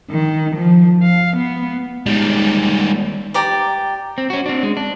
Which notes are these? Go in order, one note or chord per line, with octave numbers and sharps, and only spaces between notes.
D#3
F3
F5
B3
D#3 G3 G#3
G4 D5 A#5
C4
C#4 F#4
C4 D4
G#3
D4